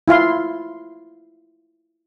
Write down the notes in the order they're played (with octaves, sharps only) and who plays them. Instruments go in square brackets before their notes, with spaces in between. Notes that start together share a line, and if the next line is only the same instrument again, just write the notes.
[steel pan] E4 F4 F5 C6